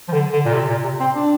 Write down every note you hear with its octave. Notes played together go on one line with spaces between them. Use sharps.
F3
D3
D3
A#2
C3
A#2
C3
C4
D4